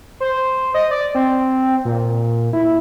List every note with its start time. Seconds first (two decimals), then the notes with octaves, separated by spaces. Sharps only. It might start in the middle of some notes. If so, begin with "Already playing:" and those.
0.20 C5
0.74 D#5
0.91 D5
1.15 C4
1.85 A#2
2.53 E4